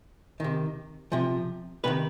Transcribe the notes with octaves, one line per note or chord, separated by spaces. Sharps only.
C3 D#3
C3 F3
C3 D#3 B3 B4